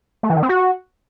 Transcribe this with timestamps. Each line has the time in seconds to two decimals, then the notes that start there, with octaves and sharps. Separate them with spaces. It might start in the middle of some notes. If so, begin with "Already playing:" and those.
0.23 A3
0.30 E3
0.36 D#3
0.43 C4
0.49 F#4